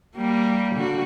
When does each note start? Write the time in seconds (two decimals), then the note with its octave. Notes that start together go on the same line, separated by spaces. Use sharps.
0.15 G3 A#3
0.75 D3 F#4